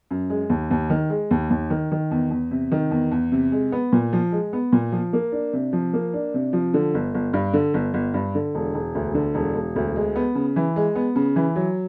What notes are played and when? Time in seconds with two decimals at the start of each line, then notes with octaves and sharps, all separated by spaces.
0.11 F#2
0.30 G#3
0.50 D#2
0.71 D#2
0.90 D#3
1.10 G#3
1.31 D#2
1.50 D#2
1.70 D#3
1.92 D#3
2.11 E2
2.31 E2
2.51 C3
2.72 D#3
2.91 E2
3.12 E2
3.32 C3
3.52 G#3
3.72 B3
3.93 A#2
4.13 F3
4.32 G#3
4.53 B3
4.73 A#2
4.92 F3
5.13 A#3
5.32 D4
5.53 C3
5.73 F3
5.93 A#3
6.14 D4
6.34 C3
6.53 F3
6.74 D3
6.94 G1
7.14 G1
7.34 G2
7.54 D3
7.74 G1
7.94 G1
8.14 G2
8.35 D3
8.55 E1
8.74 E1
8.95 D2
9.14 D3
9.35 E1
9.55 E1
9.76 D2
9.96 G#3
10.16 B3
10.35 C#3
10.56 E3
10.76 G#3
10.95 B3
11.16 C#3
11.36 E3
11.56 F#3